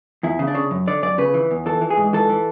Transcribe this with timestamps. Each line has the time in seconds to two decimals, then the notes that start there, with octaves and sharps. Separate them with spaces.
0.23 E2 E4
0.39 C#3
0.47 D4
0.55 C#3
0.71 F#2
0.87 D3 D5
1.02 F#2 D5
1.18 C#3 B4
1.34 E3
1.51 E2
1.66 E3 A4
1.81 E3
1.90 G#4
1.97 G#2
2.13 E3 A4
2.30 E3